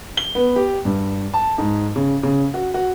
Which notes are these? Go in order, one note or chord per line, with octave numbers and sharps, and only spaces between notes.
G7
B3
G4
G2
A5
G#2
C#3
C#3
F#4
F#4